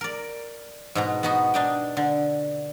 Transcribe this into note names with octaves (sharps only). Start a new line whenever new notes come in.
A#4 D5
G#2 B2 A#5
B3 D#4 F#4
D4 D#4 G5
D3